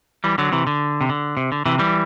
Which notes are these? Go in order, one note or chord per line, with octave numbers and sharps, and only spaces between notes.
E3 G3
D3 F#3
C3 E3
D3
C3
D3
C3
D3
C3 E3
E3 G3